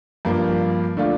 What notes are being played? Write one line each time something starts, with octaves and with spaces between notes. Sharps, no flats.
G2 F3 A#3
D3 A3 D4 F4